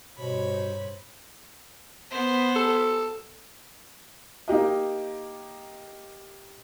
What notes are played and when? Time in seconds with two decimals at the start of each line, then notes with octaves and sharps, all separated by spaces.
0.18 G2 B2 C5 C#5 B5
2.10 B3 C5
2.56 A4
4.48 A#3 D#4 G4 D#5